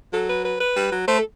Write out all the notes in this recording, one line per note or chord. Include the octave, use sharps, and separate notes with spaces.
F#3 A4
B4
B4
B4
G3
F#3
A3 C5
A4